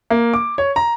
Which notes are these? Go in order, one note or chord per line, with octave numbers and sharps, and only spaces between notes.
A#3
D6
C#5
A#5